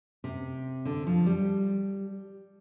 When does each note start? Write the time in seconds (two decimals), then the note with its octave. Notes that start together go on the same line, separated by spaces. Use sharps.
0.24 C3
0.85 D3
1.07 F3
1.26 G3